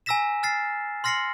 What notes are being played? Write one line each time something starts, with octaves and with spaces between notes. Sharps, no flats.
G#5 A#5 E6 A#6 B6 E7
F6 A6 C7
C6 F6 A#6 C7 C#7 F#7